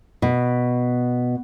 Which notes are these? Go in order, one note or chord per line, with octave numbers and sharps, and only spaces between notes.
B2